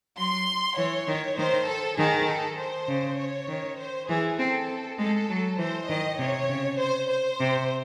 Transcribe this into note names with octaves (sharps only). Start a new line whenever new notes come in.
F#3 C6
E3 C#5
D#3
D#3 C5
A4
D#3 G#4
A4
C5
C#3
C#5
D#3
C5
E3 G#4
C4 A4
G#3 A4
F#3
E3 C5
D#3 D#5
C3 C#5
C#3
C5
C5
C3